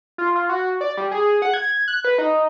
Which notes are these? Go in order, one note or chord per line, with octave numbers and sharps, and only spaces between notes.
F4
F4
F#4
D5
G3
G#4
F#5
G#6
F#6
B4
D#4